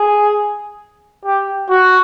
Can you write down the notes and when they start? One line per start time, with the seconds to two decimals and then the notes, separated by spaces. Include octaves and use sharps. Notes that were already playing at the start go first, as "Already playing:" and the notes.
Already playing: G#4
1.25 G4
1.70 F#4